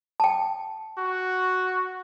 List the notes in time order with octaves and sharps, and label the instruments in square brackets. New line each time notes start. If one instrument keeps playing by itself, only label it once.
[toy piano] G5 A5
[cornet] F#4